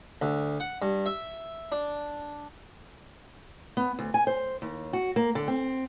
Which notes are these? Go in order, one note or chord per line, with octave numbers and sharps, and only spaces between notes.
D2
F#5
G2
E5
D4
B3
D2
G#5
C5
D#2
F#4
A#3
D3
C4